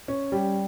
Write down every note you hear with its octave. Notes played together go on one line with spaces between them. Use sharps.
C#4
G3